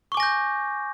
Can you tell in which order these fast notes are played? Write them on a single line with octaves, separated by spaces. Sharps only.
C#6 D6 G#5 A#6 G6